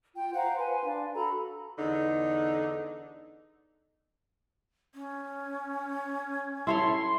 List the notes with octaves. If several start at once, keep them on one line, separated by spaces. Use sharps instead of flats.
F4 G5
C5 F5 F#5 A#5
B4 G#5 C6
D4 F5
F#4 A4 A#5 B5
E2 D3 D#4
C#4
E4 A4 C#5 C6